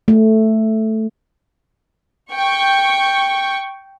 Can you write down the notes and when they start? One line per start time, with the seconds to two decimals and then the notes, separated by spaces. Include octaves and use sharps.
0.08 A3
2.33 G5 C#6